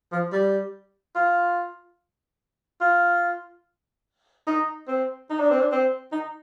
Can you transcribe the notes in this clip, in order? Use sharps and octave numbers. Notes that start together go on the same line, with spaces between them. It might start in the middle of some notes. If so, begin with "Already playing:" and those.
F3
G3
F4
F4
D#4
C4
D#4
D4
C4
D4
C4
D#4